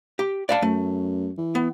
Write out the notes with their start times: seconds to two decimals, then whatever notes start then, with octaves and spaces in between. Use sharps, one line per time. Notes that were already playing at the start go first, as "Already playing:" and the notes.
0.19 G4
0.49 D5 F5 A5
0.62 F#2 A3
1.38 E3
1.55 B3